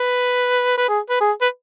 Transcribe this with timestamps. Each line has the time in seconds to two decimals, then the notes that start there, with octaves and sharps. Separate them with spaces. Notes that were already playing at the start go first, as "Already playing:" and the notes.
Already playing: B4
0.78 B4
0.88 G#4
1.09 B4
1.21 G#4
1.41 B4